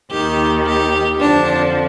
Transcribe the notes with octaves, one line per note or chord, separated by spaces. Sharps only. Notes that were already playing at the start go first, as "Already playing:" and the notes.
D#2 D#3 G4
G4
F2 D3 F3 D4